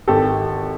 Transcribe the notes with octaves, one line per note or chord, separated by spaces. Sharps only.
G#1 G4 A4